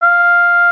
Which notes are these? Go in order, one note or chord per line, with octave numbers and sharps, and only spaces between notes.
F5